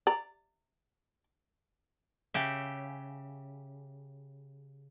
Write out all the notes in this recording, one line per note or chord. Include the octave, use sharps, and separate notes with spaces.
D5 A#5
C#3 G4 E5